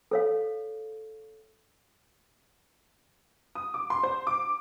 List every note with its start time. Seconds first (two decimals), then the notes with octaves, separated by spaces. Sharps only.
0.11 A4 C#5 F5
3.55 D#6
3.74 D6
3.90 C6
4.03 C5
4.27 D6